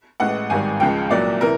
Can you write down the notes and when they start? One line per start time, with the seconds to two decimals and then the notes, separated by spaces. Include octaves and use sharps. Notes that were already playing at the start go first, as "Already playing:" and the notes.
0.20 A1 A2 E3 G#3 F#5
0.50 G#1 G#2 D#3 G3 G#5
0.80 C#2 C#3 F3 G#3 G5
1.10 C2 A#2 F#3 D5
1.41 C3 E3 A#4